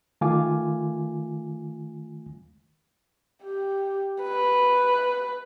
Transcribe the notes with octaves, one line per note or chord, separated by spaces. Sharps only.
D#3 A3 F4 F5 G#5 D6
G4
B4